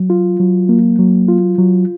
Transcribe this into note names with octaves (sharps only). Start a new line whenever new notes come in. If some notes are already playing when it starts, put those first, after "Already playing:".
Already playing: F#3
F4
F#3
A#3
F#3
F4
F#3